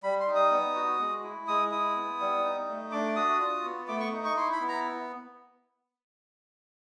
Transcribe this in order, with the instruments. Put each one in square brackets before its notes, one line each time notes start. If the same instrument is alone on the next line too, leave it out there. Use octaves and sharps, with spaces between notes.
[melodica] G3 B5
C6
D#4
D#6
B3
F#4
G#3
E4
G#3 D#6
E4 D#6
B3
G3
D#4
A3
D4 D6
F#4 D#6
F4
B3
A3 D6
C#6
D#4
C#6
E4 C6
B5
B3
A#5